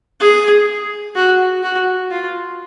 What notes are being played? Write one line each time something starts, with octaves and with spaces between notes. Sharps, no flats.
G#4
F#4
F#4
F4